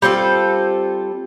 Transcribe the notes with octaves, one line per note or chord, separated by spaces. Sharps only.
G3 C4 F4 A4